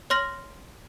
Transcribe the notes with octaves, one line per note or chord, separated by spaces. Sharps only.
C#5 C6 F6 A#6 F#7